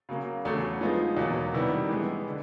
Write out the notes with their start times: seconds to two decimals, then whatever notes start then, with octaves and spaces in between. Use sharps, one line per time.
0.09 C#3 F#3 A#3
0.45 E2 C#3 F#3 A3
0.81 F3 G#3 B3 D#4
1.17 E2 B2 F#3 A#3
1.53 C3 D#3 G3 B3 E4
1.89 E3 G#3 B3
2.27 D3